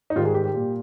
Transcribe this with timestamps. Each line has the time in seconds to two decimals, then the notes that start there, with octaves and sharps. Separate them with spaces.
0.10 D#4
0.16 G#2 D#3 G3 F4
0.25 G#4
0.34 G4
0.45 G4
0.54 A#2 G3